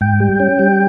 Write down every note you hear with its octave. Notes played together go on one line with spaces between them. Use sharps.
G#2 G5
G3
C#4
G3